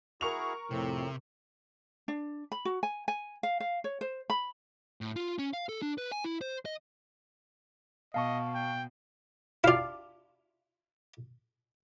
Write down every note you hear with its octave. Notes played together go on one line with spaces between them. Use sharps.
E4 F#4 G#4 A#4 C#6 F7
F2 A2 C3 C4
D4
B5
F#4
G#5
G#5
F5
F5
C#5
C5
B5
A2
F4
C#4
F5
A4
D4
B4
G#5
E4
C5
D#5
B2 D#5 F5 A5 C#6
G5
E4 F4 D5 F5